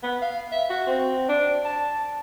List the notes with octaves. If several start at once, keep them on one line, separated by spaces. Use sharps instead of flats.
B3
F5
E5
F#4
C4
D4
A5